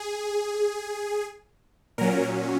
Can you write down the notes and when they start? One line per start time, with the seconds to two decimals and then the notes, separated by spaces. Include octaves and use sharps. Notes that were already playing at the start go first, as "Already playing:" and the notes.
Already playing: G#4
1.98 A#2 F#3 C#4 A#4